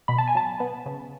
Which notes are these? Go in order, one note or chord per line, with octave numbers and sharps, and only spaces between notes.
B2 B5
A5
G#5
F#3 A5
B3
C#3